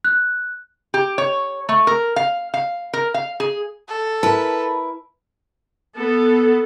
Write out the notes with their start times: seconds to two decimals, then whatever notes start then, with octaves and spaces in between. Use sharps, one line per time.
0.04 F#6
0.94 G4
1.18 C#5
1.69 A3
1.87 A#4
2.16 F5
2.54 F5
2.93 A#4
3.14 F5
3.40 G#4
3.88 A4
4.23 E4 A#4 B4 A5
5.96 B3 A4